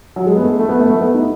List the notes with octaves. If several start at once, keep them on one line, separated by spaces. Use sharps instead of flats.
F#3
G#3
B3
A3
A3
B3
A3
A3
B3
D#4